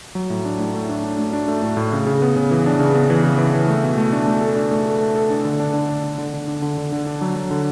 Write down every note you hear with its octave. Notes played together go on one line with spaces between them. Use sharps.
F#3
A2
D4
A2
A3
D4
D4
A3
D4
A3
A2
A2
C#3
C#3
B3
C#3
E3
D4
C#3
B3
E3
C#3
E3
E3
A3
B2
A3
D4
A3
A4
D4
A3
A4
A3
A4
D4
D3
D4
D3
D4
D4
D3
D3
D4
D3
D3
D3
D4
F#3
F#3
D3